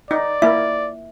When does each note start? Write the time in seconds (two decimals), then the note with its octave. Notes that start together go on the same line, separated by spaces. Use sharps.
0.11 D#4 D5
0.42 A#3 E4 E5